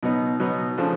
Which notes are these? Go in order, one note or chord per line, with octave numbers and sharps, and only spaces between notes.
B2 F#3 B3 D#4
B2 F#3 B3 D#4
C#3 F3 A3 D4